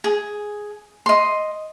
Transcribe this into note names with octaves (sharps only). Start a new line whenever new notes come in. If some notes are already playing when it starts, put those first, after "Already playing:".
G#4
D#5 C6